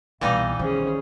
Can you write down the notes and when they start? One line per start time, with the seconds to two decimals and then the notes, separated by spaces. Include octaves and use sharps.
0.21 C2 B2 E3 G3 D#4 F5
0.59 D#3 C#4 G#4 C5